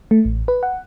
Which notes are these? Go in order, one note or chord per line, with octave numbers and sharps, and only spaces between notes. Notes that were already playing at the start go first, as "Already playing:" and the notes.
A3
A1
B4
F#5